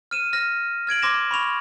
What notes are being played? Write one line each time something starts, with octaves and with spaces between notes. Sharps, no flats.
F6 D#7 E7
F6 A#6
F6 G#6 D7 F#7
C6 D6 G#6 A#6 E7
B5 C#6 F7